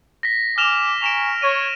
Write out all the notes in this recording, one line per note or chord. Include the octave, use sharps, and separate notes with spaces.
A#6 B6
G#5 D6 F6 E7 F7
G#5 A#5 C#6 D7 E7 F7
C#5 D#7